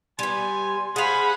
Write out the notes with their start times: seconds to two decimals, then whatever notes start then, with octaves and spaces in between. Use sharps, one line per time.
0.19 G3 B3 G#5 C6
0.96 G#3 G#4 C5 F5 F#5 G#5 B5